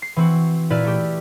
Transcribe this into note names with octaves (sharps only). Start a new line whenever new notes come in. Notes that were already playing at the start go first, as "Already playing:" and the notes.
C7
E3 C4 F#4
A#2 E4 B4 D5 F6
A3 G4